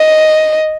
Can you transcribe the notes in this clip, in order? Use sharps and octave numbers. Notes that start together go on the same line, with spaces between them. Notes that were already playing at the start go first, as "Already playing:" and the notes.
Already playing: D#5